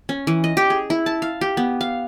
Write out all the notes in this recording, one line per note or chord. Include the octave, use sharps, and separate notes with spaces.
C#4
E3
D#5
G4
G#4
E4
A5
F5
G4
B3
F5